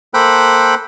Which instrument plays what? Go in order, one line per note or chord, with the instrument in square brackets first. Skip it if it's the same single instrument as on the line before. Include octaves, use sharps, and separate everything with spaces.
[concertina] A#3 A4 C5 G5 B5 F#6